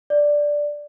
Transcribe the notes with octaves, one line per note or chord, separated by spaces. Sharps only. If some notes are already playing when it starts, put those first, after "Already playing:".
D5